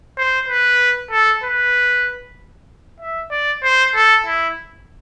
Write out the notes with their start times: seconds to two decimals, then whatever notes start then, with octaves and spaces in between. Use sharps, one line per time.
0.18 C5
0.48 B4
1.11 A4
1.43 B4
3.00 E5
3.31 D5
3.63 C5
3.95 A4
4.26 E4